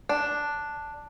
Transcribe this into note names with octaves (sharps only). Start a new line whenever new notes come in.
D4